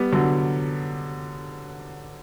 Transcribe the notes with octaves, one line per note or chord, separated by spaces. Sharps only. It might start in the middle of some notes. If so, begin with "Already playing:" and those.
Already playing: G3 B3
D3 F#3